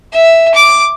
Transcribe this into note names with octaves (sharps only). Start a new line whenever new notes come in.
E5
D6